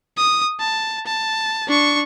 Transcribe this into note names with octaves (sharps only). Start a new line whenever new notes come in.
D#6
A5
A5
D4 C#6